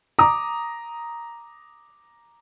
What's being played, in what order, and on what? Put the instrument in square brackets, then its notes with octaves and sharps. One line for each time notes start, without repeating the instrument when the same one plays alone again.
[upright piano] A#5 D6 D#6